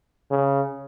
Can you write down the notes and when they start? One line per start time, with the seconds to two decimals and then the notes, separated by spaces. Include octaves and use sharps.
0.31 C#3